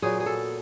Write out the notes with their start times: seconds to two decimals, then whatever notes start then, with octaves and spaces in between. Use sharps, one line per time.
0.02 A#2 F#3 B3 G#4
0.20 G#4
0.26 A4